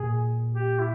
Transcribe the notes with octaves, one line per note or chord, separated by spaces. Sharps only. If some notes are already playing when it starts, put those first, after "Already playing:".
Already playing: A#2 G#4
G4
E4